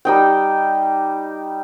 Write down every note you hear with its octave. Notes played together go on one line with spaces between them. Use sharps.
G3 D#4 G5